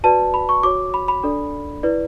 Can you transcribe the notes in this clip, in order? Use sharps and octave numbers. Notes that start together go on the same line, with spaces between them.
F#4 B4 D5 A5
B5
C#6
F#4 C#5 D6
B5
B5
D4 A4 D5
E4 B4 D5